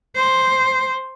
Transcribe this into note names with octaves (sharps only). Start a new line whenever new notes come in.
C5